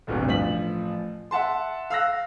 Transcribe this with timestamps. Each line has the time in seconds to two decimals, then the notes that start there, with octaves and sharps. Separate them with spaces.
0.07 D1 G1 D2 C3
0.28 A1 F3 B6 F#7
1.31 E5 F#5 A5 C6
1.90 F5 E6 F#6 A#6